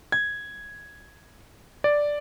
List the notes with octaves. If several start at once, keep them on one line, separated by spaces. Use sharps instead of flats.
G#6
D5